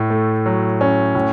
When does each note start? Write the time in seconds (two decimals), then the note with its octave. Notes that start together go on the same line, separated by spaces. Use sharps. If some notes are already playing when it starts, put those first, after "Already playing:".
Already playing: A2
0.10 A3
0.46 F#3
0.81 C#4
1.15 A2